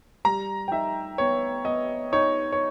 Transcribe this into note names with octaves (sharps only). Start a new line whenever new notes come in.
G3 A#5
G5
D#4 E5
B3 C#5
B3 D#5
D#4 C#5
C#5